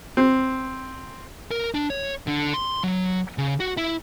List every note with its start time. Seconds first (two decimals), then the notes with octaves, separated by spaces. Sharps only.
0.17 C4
1.51 A#4
1.74 D4
1.90 C#5
2.27 D3
2.54 C6
2.83 F#3
3.38 C#3
3.60 F#4
3.77 E4